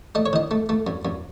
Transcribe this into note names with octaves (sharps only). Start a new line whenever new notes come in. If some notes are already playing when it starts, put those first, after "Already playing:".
A3 D#5
C#5
D#3 D#5
A3
A3
F#2
F#2